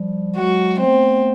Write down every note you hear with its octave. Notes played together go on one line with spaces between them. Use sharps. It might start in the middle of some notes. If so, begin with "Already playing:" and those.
Already playing: F3 G3
F#3 G#3 F#4
A3 B3 C4